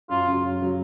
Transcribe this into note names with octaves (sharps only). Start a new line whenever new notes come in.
F#2 F4
C#3 F#3
F#2
C#3 F#3